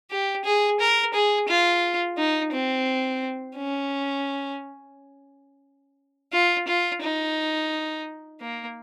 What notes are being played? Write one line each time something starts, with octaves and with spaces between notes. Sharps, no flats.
G4
G#4
A#4
G#4
F4
D#4
C4
C#4
F4
F4
D#4
A#3